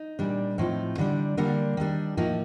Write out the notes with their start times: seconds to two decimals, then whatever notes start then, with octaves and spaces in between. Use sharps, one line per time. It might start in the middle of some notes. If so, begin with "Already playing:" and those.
Already playing: D#4
0.19 A#2 G3 D4
0.58 A2 F3 C4 D#4
0.98 D3 G3 D4
1.37 D3 G3 A#3 D4
1.77 D#3 G3 D4
2.17 A2 F3 A#3 D#4